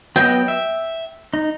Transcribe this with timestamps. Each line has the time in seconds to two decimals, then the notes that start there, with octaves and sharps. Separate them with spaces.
0.16 F#3 B3 D#5 G5
0.48 E5
1.34 D#4